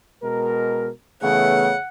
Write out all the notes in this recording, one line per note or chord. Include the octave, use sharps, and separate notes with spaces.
B2 G#3 A#4
C#3 E3 A3 B3 F#5